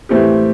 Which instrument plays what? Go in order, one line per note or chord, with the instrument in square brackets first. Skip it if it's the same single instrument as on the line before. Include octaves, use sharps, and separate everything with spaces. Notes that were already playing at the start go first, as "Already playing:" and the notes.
[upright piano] A2 E3 A3 C4 G4